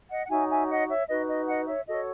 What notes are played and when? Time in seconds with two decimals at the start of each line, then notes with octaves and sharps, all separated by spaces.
0.10 D#5 F#5
0.26 F#5
0.30 D#4 F#4 C#5 E5 G#5
0.49 E5 G#5
0.69 D#5 F#5
0.89 C#5 E5
1.08 D#4 F#4 B4 D#5
1.28 D#5
1.48 D#5 F#5
1.67 C#5 E5
1.87 F#4 A4 C#5 D#5